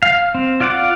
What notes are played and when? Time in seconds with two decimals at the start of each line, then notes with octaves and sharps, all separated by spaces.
0.03 F5
0.35 C4
0.60 F4 D5 F5 F#5 D6